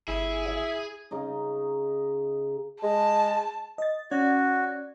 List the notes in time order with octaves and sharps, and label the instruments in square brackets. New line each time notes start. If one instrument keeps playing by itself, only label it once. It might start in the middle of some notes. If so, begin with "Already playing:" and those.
[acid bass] G1 [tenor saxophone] E4 [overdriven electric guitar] G#4
[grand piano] E5
[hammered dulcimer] C#3 D#4
[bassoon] G#3 [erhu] A5
[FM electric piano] D#5 A6
[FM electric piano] C#4 D5 G#6 [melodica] F#4